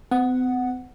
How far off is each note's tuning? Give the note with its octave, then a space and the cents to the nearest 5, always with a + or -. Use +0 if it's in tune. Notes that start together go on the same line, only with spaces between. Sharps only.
C4 -45 F#5 +0